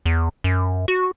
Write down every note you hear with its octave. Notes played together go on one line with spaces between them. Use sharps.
E2
F#2
F#4